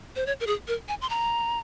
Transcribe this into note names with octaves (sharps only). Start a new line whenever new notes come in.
C5
C#5
A#4
G#4
A#4
G#5
C6
A#5